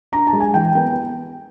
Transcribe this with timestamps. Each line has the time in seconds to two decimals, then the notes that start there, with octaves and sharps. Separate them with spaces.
0.12 D4 A#5
0.27 A5
0.33 G#3
0.40 G#5
0.54 E3 G5
0.75 B3 G5